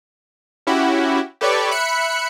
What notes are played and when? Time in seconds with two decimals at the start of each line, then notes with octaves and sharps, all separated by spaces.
0.67 C#4 E4 F#4 G4
1.41 G4 A4 B4 C#5 D5 C#6
1.71 E5 B5 F#6 C#7